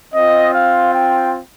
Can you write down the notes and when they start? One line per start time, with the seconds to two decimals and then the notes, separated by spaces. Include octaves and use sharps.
0.13 C4 F4 D#5
0.53 F5
0.93 G5